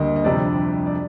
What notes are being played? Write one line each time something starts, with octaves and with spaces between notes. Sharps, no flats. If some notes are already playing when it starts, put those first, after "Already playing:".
Already playing: D2 D3 G3 A#3 D#5
D#5
F2 C3 G3 D4 D5
D5